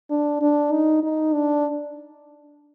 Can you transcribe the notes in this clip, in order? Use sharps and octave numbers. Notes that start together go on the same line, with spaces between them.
D4
D4
D#4
D#4
D4